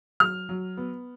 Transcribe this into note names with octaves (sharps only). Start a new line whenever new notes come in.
F#3 F6
F#3
B3